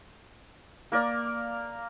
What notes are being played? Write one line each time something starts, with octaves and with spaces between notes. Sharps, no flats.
A#3 A#4 D5